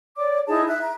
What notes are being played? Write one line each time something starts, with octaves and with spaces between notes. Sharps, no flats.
C#5 D5 D6
D#4 E4 G#4 A5
E5 F#6
A#5